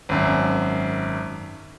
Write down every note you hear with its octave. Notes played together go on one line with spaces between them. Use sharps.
G#1 F#2